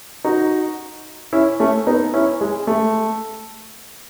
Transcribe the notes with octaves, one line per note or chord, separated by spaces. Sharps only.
D#4 F#4
C#4 E4
A3 C#4
B3 D#4
C#4 E4
G#3
A3